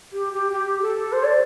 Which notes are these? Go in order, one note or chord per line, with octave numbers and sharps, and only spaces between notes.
G4
G4
G4
A4
C5
D5